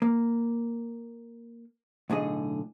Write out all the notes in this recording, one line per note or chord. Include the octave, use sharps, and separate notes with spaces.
A#3
B1 A2 D3 G#4 D#5